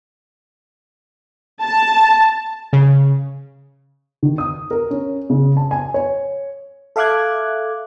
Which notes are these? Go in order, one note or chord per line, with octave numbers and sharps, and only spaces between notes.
A5
C#3
D#3
D#6
A#4
C#4
C#3
A5
G#5
C#5
A4 E5 F5 D6 F#6 G#6